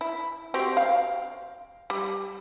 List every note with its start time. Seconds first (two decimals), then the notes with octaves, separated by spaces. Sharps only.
0.01 E4
0.54 C4 F#4 G4
0.77 F5
1.90 G3